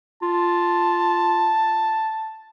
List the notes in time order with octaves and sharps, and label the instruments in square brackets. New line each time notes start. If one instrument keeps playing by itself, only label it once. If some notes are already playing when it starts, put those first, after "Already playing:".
[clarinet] F4 [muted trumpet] A5